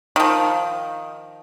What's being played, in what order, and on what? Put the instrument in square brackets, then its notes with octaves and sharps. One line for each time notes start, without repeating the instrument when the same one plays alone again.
[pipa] D#3 F3